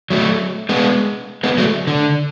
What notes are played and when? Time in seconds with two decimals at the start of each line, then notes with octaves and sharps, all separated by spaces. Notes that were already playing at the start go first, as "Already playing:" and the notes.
0.10 F#3 A3
0.69 G#3 B3
1.43 G#3 B3
1.58 F#3 A3
1.87 D3